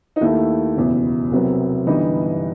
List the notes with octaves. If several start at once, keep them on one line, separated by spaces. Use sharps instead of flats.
D#4
D#2 D#3 A3 E4
F#1 E2 B2
C2 C3 F#3 B3
G1 G2 E3 G3 B3 D#4